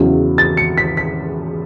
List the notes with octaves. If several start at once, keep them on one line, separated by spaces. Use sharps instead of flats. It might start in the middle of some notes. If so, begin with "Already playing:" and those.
Already playing: E2 C#3 F#3 C#4 E4
A6
C#7
B6
B6